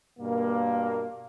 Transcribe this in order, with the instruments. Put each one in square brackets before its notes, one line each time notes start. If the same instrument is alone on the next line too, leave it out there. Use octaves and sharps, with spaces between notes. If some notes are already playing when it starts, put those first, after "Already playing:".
[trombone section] G2 B2 A#3